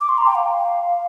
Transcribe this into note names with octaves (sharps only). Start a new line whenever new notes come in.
D6
C6
A#5
G5
F5